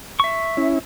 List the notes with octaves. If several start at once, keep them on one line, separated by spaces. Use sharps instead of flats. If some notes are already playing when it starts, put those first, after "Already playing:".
E5 C#6
C#4 E4